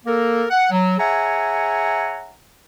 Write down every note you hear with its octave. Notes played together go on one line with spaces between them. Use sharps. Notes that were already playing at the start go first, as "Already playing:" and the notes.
A#3 A4 A#4
F#5
F#3
G#4 C#5 E5 F#5 G#5 A#5